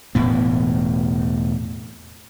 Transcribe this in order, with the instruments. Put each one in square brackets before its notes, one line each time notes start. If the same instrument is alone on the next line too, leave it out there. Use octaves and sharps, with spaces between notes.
[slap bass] E1 A2 B3